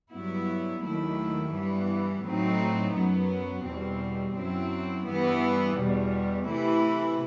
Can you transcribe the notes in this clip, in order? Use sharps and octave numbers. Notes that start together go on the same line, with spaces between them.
G2 F#3 B3 E4
D#2 D#3 F#3 A3 E4
G2 E3 B3
A2 F#3 A3 C4 D#4
F#2 F#3 B3
E2 B2 G3 C4
F#2 F#3 C4 E4
G2 E3 B3
E2 B2 G3
C3 E3 A3 E4